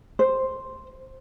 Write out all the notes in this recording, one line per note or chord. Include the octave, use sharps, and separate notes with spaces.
C5